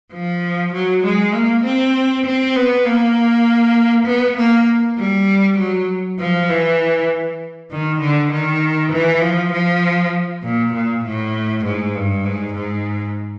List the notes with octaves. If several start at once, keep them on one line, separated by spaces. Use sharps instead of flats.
F3
F#3
G#3
A#3
C4
C4
B3
A#3
B3
A#3
G3
F#3
F3
E3
D#3
D3
D#3
E3
F3
F3
A#2
A#2
A2
G#2
G2
G#2
G#2